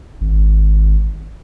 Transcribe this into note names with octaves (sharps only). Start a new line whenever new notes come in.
G#1